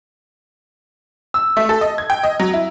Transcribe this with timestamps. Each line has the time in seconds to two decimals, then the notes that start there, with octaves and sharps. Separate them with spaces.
1.34 E6
1.57 A3
1.69 A4
1.81 D#5
1.98 G#6
2.10 G5
2.23 D#5
2.40 F#3
2.54 E4